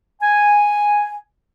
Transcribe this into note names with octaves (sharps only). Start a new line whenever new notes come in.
G#5